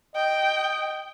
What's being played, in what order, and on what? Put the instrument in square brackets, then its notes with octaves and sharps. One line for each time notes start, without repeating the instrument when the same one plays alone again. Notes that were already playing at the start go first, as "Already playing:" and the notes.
[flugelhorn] D#5 [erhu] G5